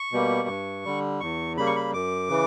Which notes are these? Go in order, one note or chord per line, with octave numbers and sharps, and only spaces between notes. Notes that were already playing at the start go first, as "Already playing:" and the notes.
Already playing: C#6
B2 G3 A#3
G2
D3 G3
E2 C#6
C#3 G3 A#3 B5
C#6
B5
F#2 D6
C#3 E3